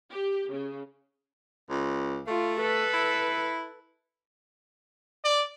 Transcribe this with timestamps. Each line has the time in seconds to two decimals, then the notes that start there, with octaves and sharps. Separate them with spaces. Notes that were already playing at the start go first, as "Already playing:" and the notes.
0.12 G4
0.52 C#3
1.70 C#2
2.27 A3 F4
2.61 A4 B4
2.93 E4
5.24 D5